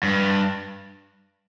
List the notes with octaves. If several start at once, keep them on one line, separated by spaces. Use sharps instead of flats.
G2